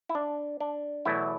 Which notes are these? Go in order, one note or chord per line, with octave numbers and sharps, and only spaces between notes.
E4
D4
D4
E2 B2 F#3 A3 E4